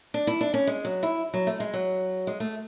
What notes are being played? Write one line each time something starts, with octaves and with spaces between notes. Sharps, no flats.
D4
E4
D4
C#4
G#3
F#3
E4
F#3
A3
G#3
F#3
G#3
A3